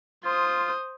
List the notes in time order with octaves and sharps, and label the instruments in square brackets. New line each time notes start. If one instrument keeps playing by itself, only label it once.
[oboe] F4 [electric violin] C5 D#6